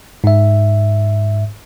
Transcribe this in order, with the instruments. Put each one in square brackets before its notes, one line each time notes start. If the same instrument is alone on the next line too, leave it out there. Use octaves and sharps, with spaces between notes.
[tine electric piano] G#2 E5